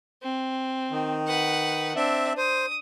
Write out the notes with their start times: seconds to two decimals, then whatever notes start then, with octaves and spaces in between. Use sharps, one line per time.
0.23 C4
0.91 D#3
1.27 B4 F#5
1.96 C4 D4 E5
2.37 C5 D#6